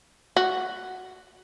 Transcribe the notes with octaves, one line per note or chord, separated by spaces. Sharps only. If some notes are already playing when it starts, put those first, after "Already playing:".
F#4